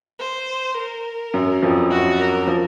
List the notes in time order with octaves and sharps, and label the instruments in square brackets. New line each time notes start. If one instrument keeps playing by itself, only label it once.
[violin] C5
A#4
[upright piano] F#2 F#3
F2 F3
[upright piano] F#2 F#3 [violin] F#4
[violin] A#4
[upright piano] F3